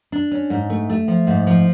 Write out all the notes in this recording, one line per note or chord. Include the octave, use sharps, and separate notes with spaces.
D4
C#4
G#2
A3
A3
F3
G#2
F3